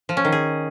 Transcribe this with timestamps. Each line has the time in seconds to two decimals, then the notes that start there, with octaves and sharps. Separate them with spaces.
0.09 F3
0.17 C#4
0.25 D#3
0.32 G#4